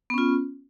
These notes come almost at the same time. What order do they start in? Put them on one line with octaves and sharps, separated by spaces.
B3 C#4 F4